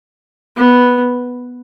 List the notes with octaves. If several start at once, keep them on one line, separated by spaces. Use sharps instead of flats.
B3